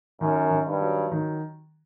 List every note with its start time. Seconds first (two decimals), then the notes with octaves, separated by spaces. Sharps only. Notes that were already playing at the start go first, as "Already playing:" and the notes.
0.21 F#2 D#3
0.51 D#3
0.67 G2
0.81 F#3
1.11 D#3